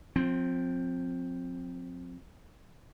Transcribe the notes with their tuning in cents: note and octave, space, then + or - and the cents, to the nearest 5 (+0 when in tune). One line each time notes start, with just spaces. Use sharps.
F3 +30 C4 +0